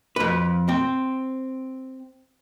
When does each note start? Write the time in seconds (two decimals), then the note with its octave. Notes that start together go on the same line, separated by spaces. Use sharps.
0.16 F2 B4
0.69 C4